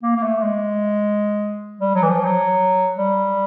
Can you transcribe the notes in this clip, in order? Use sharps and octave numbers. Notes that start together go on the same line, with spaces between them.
A#3
A#3
A3
G#3
G3
F#3
E3
F3
F#3
G3